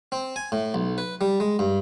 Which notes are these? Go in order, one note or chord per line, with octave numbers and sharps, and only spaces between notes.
C4
G#5
A2
B1
B4
G3
G#3
G2